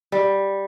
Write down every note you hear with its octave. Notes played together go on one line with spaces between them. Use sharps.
G3